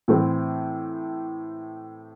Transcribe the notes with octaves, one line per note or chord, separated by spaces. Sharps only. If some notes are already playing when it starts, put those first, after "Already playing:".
A2 E3 A3 C4